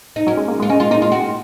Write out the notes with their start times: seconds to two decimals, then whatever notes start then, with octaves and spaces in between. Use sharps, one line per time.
0.16 D#4
0.27 F#3 C#4
0.37 G#3
0.48 A#3
0.60 G#3 F4
0.69 C#4 D#4
0.80 G#3 F4
0.91 A#3 D#4
1.02 G#3 F4
1.12 F#4